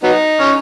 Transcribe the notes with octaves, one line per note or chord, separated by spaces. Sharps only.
F#3 B3 D#4
C#4